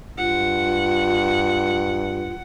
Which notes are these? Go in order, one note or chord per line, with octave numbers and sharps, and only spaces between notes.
G2 F4 F#5